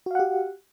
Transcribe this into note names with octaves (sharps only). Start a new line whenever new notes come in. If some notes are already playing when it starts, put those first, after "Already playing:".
F#4 G4 F5 F#5